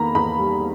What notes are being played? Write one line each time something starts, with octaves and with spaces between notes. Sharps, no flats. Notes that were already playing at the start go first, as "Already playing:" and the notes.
Already playing: E2 D#3 A#3 A#5 B5
E2 B5
G3